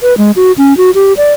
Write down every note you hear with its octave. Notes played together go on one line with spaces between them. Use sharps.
B4
G#3
F#4
C#4
F#4
G4
D5